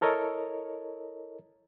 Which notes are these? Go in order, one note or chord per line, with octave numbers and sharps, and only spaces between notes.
E4 A4 A#4 C#5 D#5